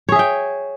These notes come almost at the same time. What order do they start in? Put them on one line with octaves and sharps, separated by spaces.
C#5 G#4 E5 G5